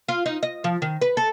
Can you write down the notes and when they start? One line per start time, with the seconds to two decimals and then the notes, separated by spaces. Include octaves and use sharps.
0.09 F4
0.26 D#4
0.43 D#5
0.64 F3
0.82 D#3
1.01 B4
1.17 A4